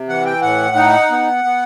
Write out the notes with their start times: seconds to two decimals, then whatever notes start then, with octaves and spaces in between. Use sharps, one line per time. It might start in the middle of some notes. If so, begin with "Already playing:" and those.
Already playing: C3
0.09 E3 F#5
0.25 G5
0.42 A2 F#5
0.76 D#4
1.11 B3
1.44 B3